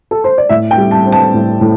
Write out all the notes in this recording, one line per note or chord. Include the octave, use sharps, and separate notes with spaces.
A4
C5
D5
A2 E5
G5
G3
A5
C4
A5
A2
A2